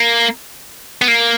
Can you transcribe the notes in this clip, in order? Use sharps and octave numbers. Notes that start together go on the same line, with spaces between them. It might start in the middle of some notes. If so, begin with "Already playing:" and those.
Already playing: A#3
B3
A#3